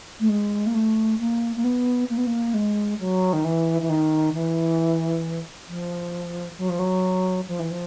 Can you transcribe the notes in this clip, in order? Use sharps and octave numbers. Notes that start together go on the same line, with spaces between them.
A3
G#3
A#3
A3
A#3
A#3
B3
A#3
B3
A#3
G#3
F#3
D#3
E3
E3
D#3
E3
F3
F#3
F3
F#3
F3
E3
F3